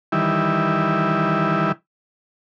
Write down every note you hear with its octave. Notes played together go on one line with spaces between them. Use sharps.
D#3 E3 G3 E4